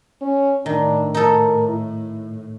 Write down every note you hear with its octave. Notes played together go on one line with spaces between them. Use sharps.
C#4
A2 D#3 D4
D#4 A4 A#4
E4